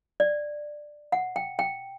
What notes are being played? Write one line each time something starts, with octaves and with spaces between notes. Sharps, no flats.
D5
F#5
G5
G5